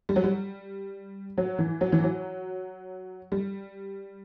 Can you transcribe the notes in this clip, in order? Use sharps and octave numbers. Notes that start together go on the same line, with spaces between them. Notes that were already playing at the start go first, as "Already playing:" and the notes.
G3
F#3
G3
F#3
E3
F#3
E3
F#3
G3